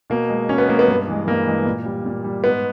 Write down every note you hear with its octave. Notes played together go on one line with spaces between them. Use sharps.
B2 A#3
G#3
B2 C#4
B3
G#3 A#3
B3
G2
E3 G#3
G2 A#3
E3 G#3
A#2
G3
A#2
G3
G#2 B3